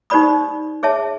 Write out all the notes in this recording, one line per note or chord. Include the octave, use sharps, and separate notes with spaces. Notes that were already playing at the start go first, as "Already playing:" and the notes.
D#4 G4 C5 D5 B5 D#6
G#4 C#5 E5 A5